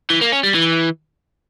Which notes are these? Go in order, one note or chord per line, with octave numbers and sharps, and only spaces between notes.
E3
A#3
C#4
G3
E3